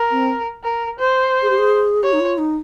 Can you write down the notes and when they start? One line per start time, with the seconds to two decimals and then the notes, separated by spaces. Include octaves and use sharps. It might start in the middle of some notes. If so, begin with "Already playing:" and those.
Already playing: A#4
0.11 C4
0.63 A#4
0.98 C5
1.42 G#4
1.50 G4
1.58 G#4
2.03 G4 C#5
2.13 D#4
2.20 F4
2.38 D#4